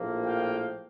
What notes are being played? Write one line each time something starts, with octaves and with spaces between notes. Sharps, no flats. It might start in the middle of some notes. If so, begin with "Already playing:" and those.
Already playing: A#1 A2 F3 A#3
F5 G5